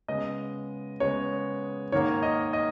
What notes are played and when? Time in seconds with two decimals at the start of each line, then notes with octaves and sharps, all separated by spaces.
0.08 C#3 G#3 B3 D#5
1.00 C#3 G#3 B3 C#5
1.92 G#2 D#3 A#3 C#5
2.23 D#5
2.53 D#5